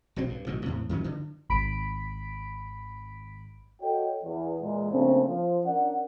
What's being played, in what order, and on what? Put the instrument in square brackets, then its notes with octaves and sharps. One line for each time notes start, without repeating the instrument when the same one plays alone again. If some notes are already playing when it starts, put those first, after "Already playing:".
[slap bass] B1 B2 F#3 C4
G2
A1 B2 D#3 F#3
E2 A2 C3
F#2 D#3 F#3 C#4
D3
[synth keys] G#1 B5 B6 D7
[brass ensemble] F#4 A4 C#5 D#5 G5
E2
E2 A#2 G#3
C#3 F3 A3 A#3 C4 D4
F3
C#4 D4 A#4 D5 F#5